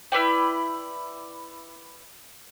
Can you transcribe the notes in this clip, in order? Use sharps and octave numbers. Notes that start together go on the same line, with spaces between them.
E4 B4 D5 G5